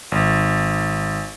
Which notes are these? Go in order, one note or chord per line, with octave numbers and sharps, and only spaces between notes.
G#1